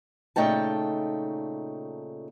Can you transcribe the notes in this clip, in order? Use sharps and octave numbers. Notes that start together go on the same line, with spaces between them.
A#2 C#3 A3 D#4 G5 A5